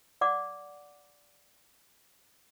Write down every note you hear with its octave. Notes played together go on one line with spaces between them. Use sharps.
D5 F#5 D6